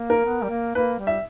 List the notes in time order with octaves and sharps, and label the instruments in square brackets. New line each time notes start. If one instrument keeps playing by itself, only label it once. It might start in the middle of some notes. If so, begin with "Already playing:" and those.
Already playing: [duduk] A#3
[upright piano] A#4
[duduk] B3
G3
A#3
[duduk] A#3 [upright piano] B4
[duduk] G3
[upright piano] E5